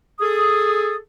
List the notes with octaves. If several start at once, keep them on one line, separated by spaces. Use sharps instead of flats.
G#4 A4 D#6